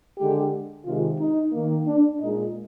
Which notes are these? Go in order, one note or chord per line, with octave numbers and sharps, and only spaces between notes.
D3 G#3 G4
C3 D#3 G#3 F4
D#4
D#3 A#3
D4
A#2 G#3 D#4